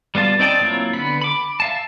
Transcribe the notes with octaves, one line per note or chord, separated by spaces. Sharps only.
G3 B3 F4 A5
C4 D#4 D5 G5 A5
F#3 A#3 C4 E4 F4
D3 B3 B5
B5 D6
E5 F5 A5